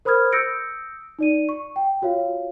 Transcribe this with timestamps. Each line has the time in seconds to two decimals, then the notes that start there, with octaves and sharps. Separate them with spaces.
0.05 A#4 C5 B5 D#6 F6 G#6
0.32 D#6 E6 G6 A#6 C#7 D7
1.19 D#4 D5 D#7
1.49 C#6
1.76 G5
2.02 F4 F#4 C#5 F5